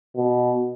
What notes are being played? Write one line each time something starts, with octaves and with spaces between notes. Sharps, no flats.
B2